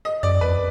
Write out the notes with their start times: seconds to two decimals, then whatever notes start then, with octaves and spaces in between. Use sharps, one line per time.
0.05 D#5
0.23 F#2 D5
0.41 F2 B4